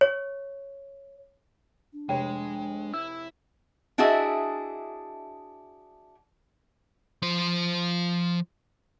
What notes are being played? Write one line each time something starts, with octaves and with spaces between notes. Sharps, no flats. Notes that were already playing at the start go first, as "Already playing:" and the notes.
C#5
D4
F1 G#3 C#5 G5
E4 E6
D4 E4 F#4 G#4 D#5 E5
F3 C5